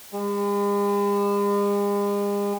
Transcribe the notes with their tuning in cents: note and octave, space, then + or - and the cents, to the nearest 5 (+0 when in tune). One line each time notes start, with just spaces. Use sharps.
G#3 -45